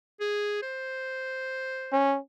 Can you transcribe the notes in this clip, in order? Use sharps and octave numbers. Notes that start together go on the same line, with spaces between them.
G#4
C5
C#4